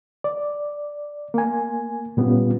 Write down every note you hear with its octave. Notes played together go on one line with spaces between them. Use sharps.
D5
A#3 G#5
A#2 G3 B3 C#4 F4